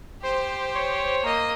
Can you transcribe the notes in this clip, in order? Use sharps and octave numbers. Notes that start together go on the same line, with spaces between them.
G4 C5
C#5
A#3 D#5